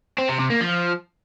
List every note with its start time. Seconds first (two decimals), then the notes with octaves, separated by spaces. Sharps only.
0.18 C4
0.29 C3
0.39 C3
0.50 A#3
0.61 F3